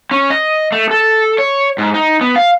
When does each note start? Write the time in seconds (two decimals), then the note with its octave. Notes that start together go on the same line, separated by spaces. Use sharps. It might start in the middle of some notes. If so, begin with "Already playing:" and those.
0.11 C#4
0.30 D#5
0.72 A3
0.91 A4
1.38 C#5
1.78 G#2
1.94 D#4
2.21 B3
2.36 F5